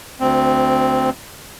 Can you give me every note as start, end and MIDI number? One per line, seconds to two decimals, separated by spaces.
0.20 1.10 38
0.20 1.10 60